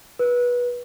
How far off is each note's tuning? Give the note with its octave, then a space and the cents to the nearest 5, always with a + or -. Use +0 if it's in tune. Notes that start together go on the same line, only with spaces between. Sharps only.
B4 -20